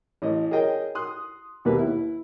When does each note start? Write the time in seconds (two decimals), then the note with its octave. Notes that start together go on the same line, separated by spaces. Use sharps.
0.22 A1 D#5
0.51 G#4 A#4 C#5 D#5 G5
0.95 C6 D#6 F#6
1.65 D#2 B2 A#3 G4 B4
1.78 E4